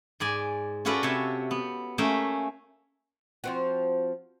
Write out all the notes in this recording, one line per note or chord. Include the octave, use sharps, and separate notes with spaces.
G#2 D5 G#5
C#4 F4 F#4 A4 B4 D5
C3 C#5 E5 A5
B3
A3 A#3 C#4 E5 G5
F3 C4 F#4